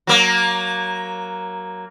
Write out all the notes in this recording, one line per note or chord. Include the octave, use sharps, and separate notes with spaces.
F#3 A#3